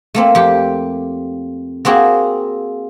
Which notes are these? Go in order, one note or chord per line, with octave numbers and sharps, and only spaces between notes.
A3 A#3 C4
F2 G4
A#3 C4 F#4 G#4